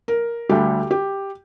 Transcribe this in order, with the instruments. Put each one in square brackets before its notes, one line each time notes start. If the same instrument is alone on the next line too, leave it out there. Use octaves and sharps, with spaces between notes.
[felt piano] A#4
D2 D3 G3 G4
G4